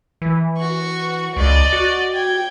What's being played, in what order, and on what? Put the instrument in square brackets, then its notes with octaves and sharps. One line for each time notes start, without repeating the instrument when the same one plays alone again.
[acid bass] E3
[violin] F#4 C#6
[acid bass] C#2 [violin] D5 D#5
[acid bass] F#4
[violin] G5 G#6